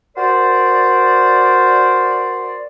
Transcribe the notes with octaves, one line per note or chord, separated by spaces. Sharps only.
F#4 A#4 C5 D5